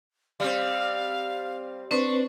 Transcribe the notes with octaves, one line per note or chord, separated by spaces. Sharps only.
G3 C4 F5
C4 D4 B4 C5 C#6